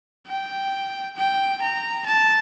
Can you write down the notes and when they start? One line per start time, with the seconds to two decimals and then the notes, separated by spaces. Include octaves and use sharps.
0.28 G5
1.17 G5
1.62 A#5
2.07 A5